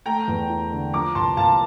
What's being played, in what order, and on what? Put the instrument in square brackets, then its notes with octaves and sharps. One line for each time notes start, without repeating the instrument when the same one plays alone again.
[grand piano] A3 [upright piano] G5 A#5
[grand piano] E2
E4
D3
[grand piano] F3 [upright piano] A#5 D6
[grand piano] C2 [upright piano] A5 C6
[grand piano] C2 [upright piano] F5 A5